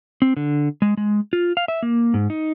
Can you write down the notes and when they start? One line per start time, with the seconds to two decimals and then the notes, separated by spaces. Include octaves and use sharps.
0.22 C4
0.37 D3
0.82 G#3
0.97 G#3
1.33 F4
1.57 F5
1.68 E5
1.83 A#3
2.14 G#2
2.30 D#4